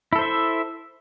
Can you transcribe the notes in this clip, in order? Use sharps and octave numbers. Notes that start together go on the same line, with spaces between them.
E4 A4 C5 E5